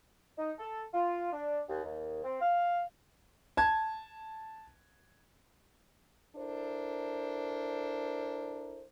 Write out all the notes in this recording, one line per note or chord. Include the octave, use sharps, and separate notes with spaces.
D#4
A4
F4
D4
D#2
D#2
C4
F5
A5 G#6
D4 E4 A4 A#4 C5